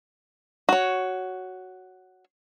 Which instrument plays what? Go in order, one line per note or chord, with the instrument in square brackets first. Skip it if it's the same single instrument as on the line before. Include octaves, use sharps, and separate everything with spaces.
[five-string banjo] F#4 C#5